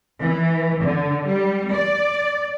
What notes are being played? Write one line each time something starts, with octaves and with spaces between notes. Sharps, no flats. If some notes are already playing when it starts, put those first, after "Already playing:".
E3
D3
G3
D5